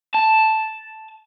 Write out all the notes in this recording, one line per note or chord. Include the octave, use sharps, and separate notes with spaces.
A5